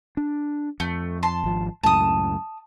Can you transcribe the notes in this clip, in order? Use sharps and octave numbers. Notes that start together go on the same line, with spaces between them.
D4
F2 A3
A5 C6
G#1 F3
C#2 F#2 A2 A5 D#6